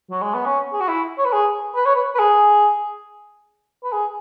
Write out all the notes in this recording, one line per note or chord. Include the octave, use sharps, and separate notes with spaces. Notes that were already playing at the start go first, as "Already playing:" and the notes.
F#3
G#3
B3
C#4
G#4
F#4
E4
C#5
B4
G#4
B4
C#5
B4
B4
G#4
B4
G#4